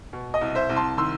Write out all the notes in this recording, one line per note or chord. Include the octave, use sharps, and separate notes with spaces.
B2
D#5
C2
C5 E5
C2
A5 C6
D#3 C6 E6